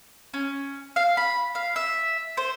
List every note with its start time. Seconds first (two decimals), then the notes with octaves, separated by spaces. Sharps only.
0.34 C#4
0.96 F5
1.17 B5
1.55 F5
1.76 E5
2.37 C5